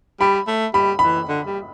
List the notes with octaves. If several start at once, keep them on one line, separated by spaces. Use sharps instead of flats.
G3 B5
A3
G3 B5
E3 B5
D3
G3